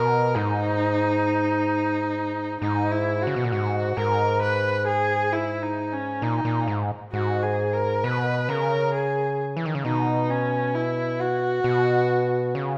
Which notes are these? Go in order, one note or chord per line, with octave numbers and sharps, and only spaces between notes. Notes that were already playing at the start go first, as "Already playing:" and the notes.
Already playing: B2 A#4
G#2 D#4
G#2 D#4
E4
F#4
C#3
B2
A#2
G#2 F#4
G#2 A#4
B4
G#4
E4
D#4
C#4
A#2 D#4
A#2
G#2
G#2 F#4
G#4
A#4
B2 B4
C#3 A#4
G#4
E3
D#3
C#3
B2 D#4
C#4
E4
F#4
B2
C#3